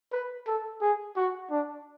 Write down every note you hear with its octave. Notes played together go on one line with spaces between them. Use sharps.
B4
A4
G#4
F#4
D4